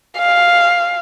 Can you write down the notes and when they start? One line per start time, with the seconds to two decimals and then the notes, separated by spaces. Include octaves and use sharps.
0.18 F5